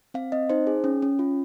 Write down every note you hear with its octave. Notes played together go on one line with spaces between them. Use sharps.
C4 F5
C4 D#5
D#4 C5
G#4
C#4
C#4
F4